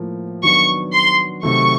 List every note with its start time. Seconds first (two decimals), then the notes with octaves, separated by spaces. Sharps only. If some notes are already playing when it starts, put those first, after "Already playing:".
Already playing: A2 F3 A#3
0.43 D#3 F#3 B3 D4 C#6
0.93 C6
1.43 C3 D#3 F#3 A3 C#6